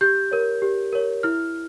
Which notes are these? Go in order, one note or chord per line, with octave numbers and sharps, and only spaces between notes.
G4 G6
A#4 C#5
G4
A#4 C#5
E4 F6